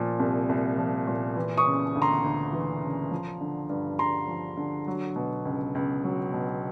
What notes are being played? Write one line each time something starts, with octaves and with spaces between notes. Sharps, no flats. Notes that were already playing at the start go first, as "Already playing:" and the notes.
Already playing: A#2 F3
C2
C2
F3
A#2
E3
C#6 D#6
C#3
D2
A#5 C6
D2
E3
C#3
F3
D3
G2
G2 A#5 C6
F3
D3
F#3
B2
C#2
C#2
F#3
B2